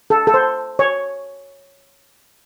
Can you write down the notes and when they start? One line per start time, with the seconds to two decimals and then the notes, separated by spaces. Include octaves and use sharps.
0.10 A4
0.27 A4
0.34 C5
0.79 C#5